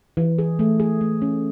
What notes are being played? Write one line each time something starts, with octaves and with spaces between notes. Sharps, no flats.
E3
G#4
A3
G#4
A3
C#4